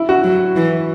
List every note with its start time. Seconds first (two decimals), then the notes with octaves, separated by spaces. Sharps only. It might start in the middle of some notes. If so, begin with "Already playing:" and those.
Already playing: E4
0.09 F#4
0.24 F#3
0.56 E3